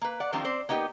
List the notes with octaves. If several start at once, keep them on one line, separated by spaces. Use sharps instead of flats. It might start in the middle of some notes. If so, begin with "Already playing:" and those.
A#3 B4
D5 F#5
D#3 F3 G3 A#3 C4 D4
C4 C5 D5
A#3 B3 D#4 F#4 G4